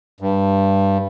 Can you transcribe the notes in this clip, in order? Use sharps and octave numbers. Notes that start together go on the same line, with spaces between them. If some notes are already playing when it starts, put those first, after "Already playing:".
G2